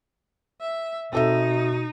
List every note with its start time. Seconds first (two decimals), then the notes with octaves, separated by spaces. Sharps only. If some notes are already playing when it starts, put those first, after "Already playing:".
0.61 E5
1.13 B2 C4 D#4 A4 E5